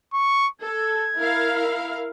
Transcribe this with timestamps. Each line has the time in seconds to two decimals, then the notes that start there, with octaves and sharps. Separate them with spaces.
0.14 C#6
0.62 A4 G#6
1.17 E4 A#4 F5